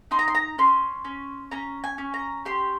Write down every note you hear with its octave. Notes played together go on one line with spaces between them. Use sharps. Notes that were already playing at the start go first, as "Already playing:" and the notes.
D#4 C6
A#5
C6
A#5
C#4 C6
C#4
C#4 A#5
G#5
C#4
A#5
G4 C6